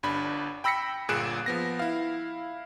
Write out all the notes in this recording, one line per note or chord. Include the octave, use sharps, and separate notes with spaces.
G1 G2 D4 B5
G5 B5 E6 A#6 B6 C#7
G1 A#2 G#4 F#6 D7 E7
F3 B3 A#6
E4 F5